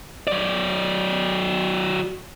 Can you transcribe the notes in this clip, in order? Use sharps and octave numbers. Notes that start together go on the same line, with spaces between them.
F#3 D5